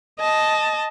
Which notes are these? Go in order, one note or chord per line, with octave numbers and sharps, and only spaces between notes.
D#5 A5